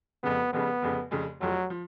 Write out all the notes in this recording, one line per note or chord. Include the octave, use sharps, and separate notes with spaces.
F1 F2 C#3 B3
F1 F2 C#3 B3
F1 F2 C#3
F1 F2 C#3
F1 F2 F3 F#3
F3